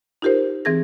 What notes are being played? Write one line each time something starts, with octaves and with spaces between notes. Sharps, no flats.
D#4 F4 G4 A#4 C5
E3 C4 G#4 G#6 A#6